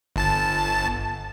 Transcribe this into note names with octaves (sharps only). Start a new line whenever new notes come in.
G1 A5 A6